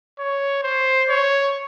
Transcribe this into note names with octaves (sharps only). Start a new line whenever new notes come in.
C#5
C5
C#5